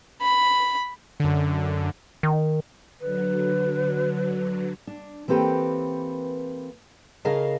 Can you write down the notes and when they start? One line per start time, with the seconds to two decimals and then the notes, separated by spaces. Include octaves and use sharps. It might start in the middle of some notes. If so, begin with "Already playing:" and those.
0.22 B5
1.20 F#2 D3
2.23 D#3
3.01 D3 F#3 B4
4.87 D4
5.28 E3 A#3 C4 G4 A4 B4
7.25 C#3 G#4 A#4 D#5 F5 A5